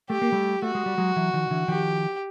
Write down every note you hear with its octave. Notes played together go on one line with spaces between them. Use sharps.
A3 G4
A#3
G3 A3
A3 F#4
G#3
G3
F#3 G#3
E3 F#3
D#3 F3
D3 E3
D#3 F3 G4